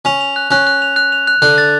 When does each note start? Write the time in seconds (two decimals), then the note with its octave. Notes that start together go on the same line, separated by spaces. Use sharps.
0.05 C#4 F7
0.21 F7
0.36 F#6
0.51 C#4 F#6
0.67 F#6
0.82 F7
0.96 F#6
1.12 F7
1.27 F#6
1.42 D3 F#6
1.58 A6